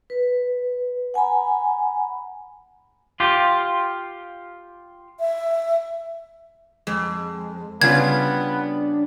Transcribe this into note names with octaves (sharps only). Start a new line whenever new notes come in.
B4
F#5 G#5 A#5 B5
F4 G4
E5
F2 G#3
C#3 G3 B3 D4 F4 G#6